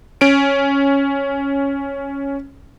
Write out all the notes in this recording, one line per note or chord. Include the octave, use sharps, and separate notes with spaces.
C#4 D7